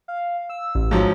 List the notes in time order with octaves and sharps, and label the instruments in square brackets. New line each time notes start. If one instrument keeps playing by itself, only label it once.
[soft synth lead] F5
E6
[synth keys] A1
[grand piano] G#2 F3 F#3